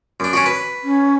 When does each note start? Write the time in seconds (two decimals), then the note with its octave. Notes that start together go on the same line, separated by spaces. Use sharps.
0.20 F#2 D4
0.33 C#4 D4 F#4
0.46 B4
0.83 C#4